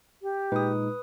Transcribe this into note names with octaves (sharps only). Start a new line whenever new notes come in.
G4
A#2 G#3 D#4 B4 D#6